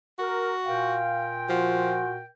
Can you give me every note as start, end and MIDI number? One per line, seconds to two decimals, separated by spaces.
0.19 0.98 66
0.19 0.51 70
0.66 2.26 46
0.66 2.26 70
0.66 1.35 77
0.66 2.26 79
1.50 2.01 53
1.50 2.20 66